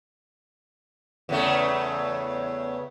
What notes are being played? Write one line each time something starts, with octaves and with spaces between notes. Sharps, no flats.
E2 C#3 A3